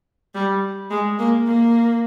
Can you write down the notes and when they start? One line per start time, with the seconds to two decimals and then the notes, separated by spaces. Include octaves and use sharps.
0.34 G3
0.90 G#3
1.19 A#3
1.47 A#3